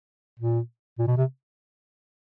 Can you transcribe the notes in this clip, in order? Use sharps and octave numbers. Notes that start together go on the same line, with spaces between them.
A#2
A#2
B2
C3